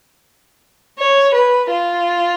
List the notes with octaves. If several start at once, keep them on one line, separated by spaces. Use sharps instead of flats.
C#5
B4
F4